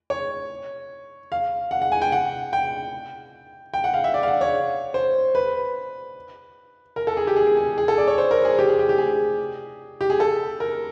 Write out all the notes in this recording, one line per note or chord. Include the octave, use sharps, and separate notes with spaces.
C#5
F5
F#5
F#5
G#5
G5
F#5
G5
G5
F#5
F5
E5
D5
F5
F#5
C#5
C5
B4
A#4
A4
G#4
G4
G#4
G#4
G#4
G#4
A4
D5
C#5
C5
A#4
G#4
G4
G#4
G4
G4
G#4
G4
G#4
A4
A#4